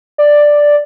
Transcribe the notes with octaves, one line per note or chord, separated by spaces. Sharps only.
D5